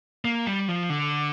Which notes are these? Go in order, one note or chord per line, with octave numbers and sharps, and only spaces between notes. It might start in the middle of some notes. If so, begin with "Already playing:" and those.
A#3
G3
F3
D3